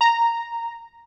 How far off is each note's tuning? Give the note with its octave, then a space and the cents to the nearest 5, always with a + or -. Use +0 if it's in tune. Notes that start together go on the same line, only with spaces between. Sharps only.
A#5 -5